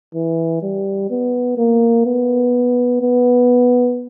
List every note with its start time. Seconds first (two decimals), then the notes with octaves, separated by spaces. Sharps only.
0.15 E3
0.62 G3
1.10 B3
1.58 A#3
2.06 B3
3.02 B3